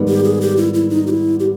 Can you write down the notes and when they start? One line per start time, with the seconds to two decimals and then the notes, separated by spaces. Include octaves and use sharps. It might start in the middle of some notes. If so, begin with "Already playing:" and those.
Already playing: G#2 D#3 G3 B3
0.08 G4
0.24 G#4
0.41 G4
0.57 E4
0.74 E4
0.90 D#4
1.07 G4
1.10 E4
1.40 G4